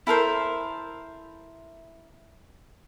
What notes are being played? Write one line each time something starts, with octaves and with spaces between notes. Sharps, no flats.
E4 A4 A#4 C5